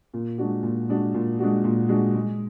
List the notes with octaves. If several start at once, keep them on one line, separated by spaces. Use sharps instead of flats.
A#2
G#3 D4 F#4
A#2
G#3 D4 F#4
A#2
G#3 D4 F#4
A#2
G#3 D4 F#4
G#3